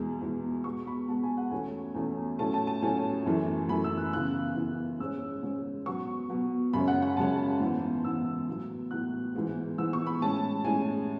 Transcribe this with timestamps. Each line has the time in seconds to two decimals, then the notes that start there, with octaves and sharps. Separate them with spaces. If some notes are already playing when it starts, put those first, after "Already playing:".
Already playing: E2 B2 G#3
0.21 E2 B2 G#3
0.64 B2 G#3 B3 C#6
0.87 B5
1.08 B2 G#3 B3 A5
1.23 G#5
1.37 F#5
1.51 E2 B2 A3 C#4 G#5
1.95 E2 B2 A3 C#4
2.39 A2 F#3 A3 C#4 A5
2.54 A5
2.67 A5
2.82 A2 F#3 A3 C#4 G#5
3.26 F#2 E3 A3
3.69 F#2 E3 A3 B5
3.84 E6
3.98 F#6
4.13 C#3 E3 B3 F#6
4.56 C#3 E3 B3
5.00 G#2 G#3 C#4 E6
5.43 G#2 G#3 C#4
5.86 B2 F#3 B3 C#6
6.30 B2 F#3 B3
6.73 F#2 C#3 G#3 C#4 B5
6.88 F#5
7.02 F#5
7.17 F#2 C#3 G#3 C#4 A5
7.60 G#2 E3 B3
8.05 G#2 E3 B3 E6
8.48 A2 F#3 B3
8.91 A2 F#3 B3 F#6
9.35 G#2 E3 G#3 B3
9.78 G#2 E3 G#3 B3 E6
9.93 C#6
10.07 B5
10.21 A2 G#3 C#4 A5
10.65 A2 G#3 C#4 G#5